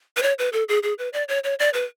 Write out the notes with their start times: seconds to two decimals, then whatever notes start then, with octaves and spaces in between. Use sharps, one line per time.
0.17 B4
0.23 C#5
0.39 B4
0.53 A4
0.69 G#4
0.83 G#4
0.98 B4
1.13 D5
1.29 C#5
1.44 C#5
1.59 D5
1.74 B4